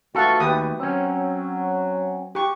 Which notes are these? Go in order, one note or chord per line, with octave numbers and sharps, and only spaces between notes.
D#3 E3 A3 F4 F#4 A4 F#5 C#6
D#2 G4 B4 D#6
F#3 C4 C#4
G4 C#6